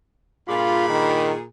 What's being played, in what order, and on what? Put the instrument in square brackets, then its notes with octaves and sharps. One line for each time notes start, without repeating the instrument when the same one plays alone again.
[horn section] G2 D5 B5 [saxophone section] A#2 G#4 [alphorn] F4
[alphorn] D#3